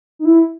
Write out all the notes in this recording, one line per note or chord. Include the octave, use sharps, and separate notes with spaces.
D#4
E4